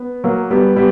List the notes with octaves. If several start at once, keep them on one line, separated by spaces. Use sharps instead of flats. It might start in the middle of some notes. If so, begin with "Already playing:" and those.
Already playing: B3
F#3 A#3
G3 B3
G3 B3